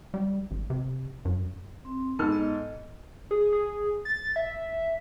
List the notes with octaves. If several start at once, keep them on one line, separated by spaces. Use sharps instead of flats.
G3
G#1
C3
F#2
C4
G#2 B3 A4 F6
D#5
G#4
G#4
A6
E5